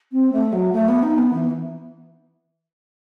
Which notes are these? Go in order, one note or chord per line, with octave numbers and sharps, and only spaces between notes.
C4
A3
F#3
A3
B3
D#4
B3
E3